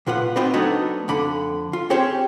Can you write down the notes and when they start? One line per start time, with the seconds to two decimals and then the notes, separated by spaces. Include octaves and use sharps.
0.07 B1 A#2 F4 B4 F#5
0.36 B3 C4 D#4 F#4 B4
0.54 F#3 A3 B3 D4 D#4 F#4
1.08 F2 D3 B5
1.73 F4
1.90 C4 C#4 G4 G#4 C5 C#5